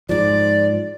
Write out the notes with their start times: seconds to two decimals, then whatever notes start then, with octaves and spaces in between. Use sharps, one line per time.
0.09 G#2 F3 D5